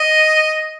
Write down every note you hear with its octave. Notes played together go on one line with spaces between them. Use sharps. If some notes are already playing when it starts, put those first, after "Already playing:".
Already playing: D#5